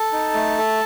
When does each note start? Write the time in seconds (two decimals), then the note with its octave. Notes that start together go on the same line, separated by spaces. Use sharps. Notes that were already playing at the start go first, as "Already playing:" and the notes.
Already playing: A4 A5
0.13 D#4
0.35 A3
0.58 A4